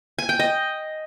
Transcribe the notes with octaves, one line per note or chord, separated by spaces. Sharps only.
G#5
G5
D#5